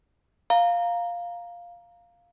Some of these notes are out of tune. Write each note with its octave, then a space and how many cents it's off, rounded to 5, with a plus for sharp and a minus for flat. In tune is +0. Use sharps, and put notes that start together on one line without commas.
F5 +0 A#5 +0